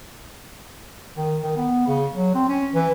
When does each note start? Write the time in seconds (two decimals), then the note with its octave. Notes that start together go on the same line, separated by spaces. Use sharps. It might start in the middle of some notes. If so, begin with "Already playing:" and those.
1.17 D#3
1.43 D#3
1.57 B3
1.88 C#3
2.14 F#3
2.35 C4
2.48 C#4
2.74 E3